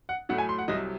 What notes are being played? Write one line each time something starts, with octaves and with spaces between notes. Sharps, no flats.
F#5
A2 F#3 A3 F#5
G#5
C6
F#5
C2 C3 F#3 D#5